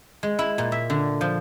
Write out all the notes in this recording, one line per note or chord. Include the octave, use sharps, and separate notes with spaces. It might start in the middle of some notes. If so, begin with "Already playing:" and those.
G#3
E4
A#2
E5
D3
F3